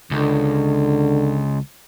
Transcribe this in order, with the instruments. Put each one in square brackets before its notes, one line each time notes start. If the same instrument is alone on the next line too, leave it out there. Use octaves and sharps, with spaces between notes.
[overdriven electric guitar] C#2 [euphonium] D3